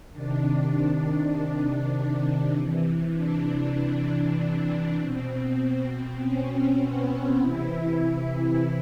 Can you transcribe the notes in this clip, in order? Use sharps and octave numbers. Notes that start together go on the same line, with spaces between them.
C3 D#3 D4
C3 E3
D4
B2 C4
C#4
B3
C3 E3 E4